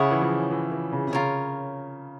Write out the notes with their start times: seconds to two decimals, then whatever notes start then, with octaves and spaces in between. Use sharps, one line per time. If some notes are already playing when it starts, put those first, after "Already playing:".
Already playing: C#3 E4 G#4 C#5 F#5
0.11 E3
0.21 F3
0.51 E3
0.72 E3
0.92 C#3
1.07 C3
1.12 C#3 F4 A#4 C#5